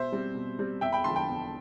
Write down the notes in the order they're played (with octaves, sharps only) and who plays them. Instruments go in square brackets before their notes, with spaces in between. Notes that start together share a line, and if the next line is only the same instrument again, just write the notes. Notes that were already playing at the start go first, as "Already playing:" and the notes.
Already playing: [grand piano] B2 C5 E5
G3 C4
B2
G3 C4
E2 E5 G5
G5 B5
D3 F3 A5 C6
G5 B5
E2